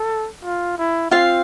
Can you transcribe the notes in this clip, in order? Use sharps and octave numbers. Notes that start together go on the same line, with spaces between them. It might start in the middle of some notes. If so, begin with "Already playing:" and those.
Already playing: A4
F4
E4
C4 F4 F5